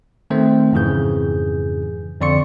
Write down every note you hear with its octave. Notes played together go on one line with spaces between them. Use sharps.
D#3 A3 C4 C5
F2 G#2 C#3 E3 G#4 G6
F2 D3 D5 C6 C#6 C#7